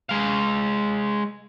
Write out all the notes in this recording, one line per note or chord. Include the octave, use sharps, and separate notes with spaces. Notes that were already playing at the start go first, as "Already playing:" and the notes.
G#3 F5